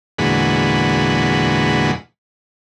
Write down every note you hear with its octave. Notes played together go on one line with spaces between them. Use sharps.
E2 A#2 D3 G#3 F#4 B5